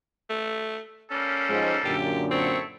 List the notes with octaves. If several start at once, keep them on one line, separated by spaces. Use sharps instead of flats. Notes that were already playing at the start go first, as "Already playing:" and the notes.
A3
G3 A#3 C#4 A4
G#2 F3 G#3
F#2 A#2 D3 G4
C4 E4 A4 C#6